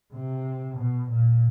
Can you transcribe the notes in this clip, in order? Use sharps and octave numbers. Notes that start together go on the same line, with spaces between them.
C3
B2
A#2